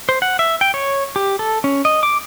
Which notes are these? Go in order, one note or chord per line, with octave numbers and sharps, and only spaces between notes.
C5
F#5
E5
G5
C#5
G4
A4
C#4
D#5
D6